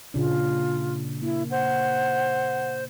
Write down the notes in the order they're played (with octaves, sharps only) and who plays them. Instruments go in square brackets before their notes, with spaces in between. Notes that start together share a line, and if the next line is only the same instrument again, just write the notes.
[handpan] A#2 C#3 D4 [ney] F4
[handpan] A#3 [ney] E4
[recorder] C5 [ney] F#5